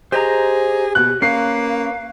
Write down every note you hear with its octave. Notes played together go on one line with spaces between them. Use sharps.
G4 G#4 C5 D#5 A#5
B2 F#6
A#3 C#4 B4 F5 C7